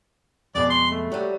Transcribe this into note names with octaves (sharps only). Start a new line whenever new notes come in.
F2 B2 G#3 D5
C6
A3
F#3 G3